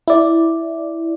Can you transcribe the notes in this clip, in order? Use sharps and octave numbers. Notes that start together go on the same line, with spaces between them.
E4 D5